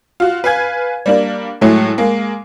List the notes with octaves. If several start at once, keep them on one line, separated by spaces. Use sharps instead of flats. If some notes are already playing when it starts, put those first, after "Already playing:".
F4 F#4
B4 F5 G#5 G#6
G3 A#3 D4
A2 F#3 G#3 A3
G#3 A#3